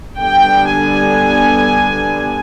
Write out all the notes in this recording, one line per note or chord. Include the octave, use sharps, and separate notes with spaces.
D3 G3 B3 D4 G5
G#5